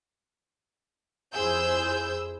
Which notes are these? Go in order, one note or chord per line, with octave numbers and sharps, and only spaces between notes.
F2 E4 G#4 C5 E6 G6